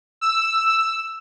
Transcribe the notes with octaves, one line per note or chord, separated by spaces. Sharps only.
E6